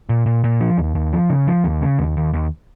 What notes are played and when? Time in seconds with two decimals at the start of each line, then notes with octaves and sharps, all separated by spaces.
0.09 A#2
0.26 A#2
0.44 A#2
0.61 F3
0.78 D#2
0.95 D#2
1.13 F3
1.30 C#3
1.47 F3
1.64 D#2
1.82 C#3
1.99 D#2
2.17 D#2
2.34 D#2